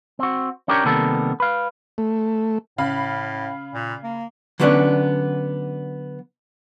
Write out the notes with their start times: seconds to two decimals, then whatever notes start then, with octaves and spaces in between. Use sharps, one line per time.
0.19 C4 F#4
0.68 C#4 D4 G4 A#4 C#5
0.85 C3 D#3 G3 A#3 B3 A4
1.40 B4 F5
1.98 A3
2.78 A2 C#3 F5 B5
3.74 A#2
4.03 A#3
4.60 D3 F#3 G3 B3 C#4 D4